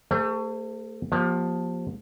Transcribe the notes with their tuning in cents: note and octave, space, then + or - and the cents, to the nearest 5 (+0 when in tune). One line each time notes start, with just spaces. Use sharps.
A3 +30 G#4 -20 C5 -15
F3 +20 A#3 +40 G4 +0